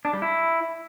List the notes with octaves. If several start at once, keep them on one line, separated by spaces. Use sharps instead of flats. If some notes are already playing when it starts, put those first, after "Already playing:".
D4
G3
E4